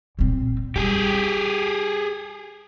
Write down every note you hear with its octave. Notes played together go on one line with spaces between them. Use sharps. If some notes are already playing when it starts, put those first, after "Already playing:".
A#2 C4
G3 G4 G#4